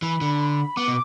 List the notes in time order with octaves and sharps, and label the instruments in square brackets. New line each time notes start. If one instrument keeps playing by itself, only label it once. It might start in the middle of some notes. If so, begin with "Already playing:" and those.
[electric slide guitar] E3 [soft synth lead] B5
[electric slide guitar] D3
[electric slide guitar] B3 [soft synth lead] D6
[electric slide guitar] B2